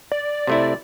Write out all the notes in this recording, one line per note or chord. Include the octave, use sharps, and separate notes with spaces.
D5
C3 A3 E4